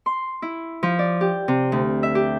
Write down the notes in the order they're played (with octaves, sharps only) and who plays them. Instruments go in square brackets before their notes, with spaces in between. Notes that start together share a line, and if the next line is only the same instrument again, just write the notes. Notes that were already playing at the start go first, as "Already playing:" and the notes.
[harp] C6
E4
F3
D5
G4
C3
D2
E5
G4